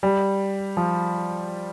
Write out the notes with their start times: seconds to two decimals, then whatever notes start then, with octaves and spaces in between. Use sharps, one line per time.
0.03 G3
0.77 F3